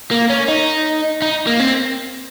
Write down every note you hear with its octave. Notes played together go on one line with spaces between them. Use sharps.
A#3
C#4
D#4
D#4
A#3
C4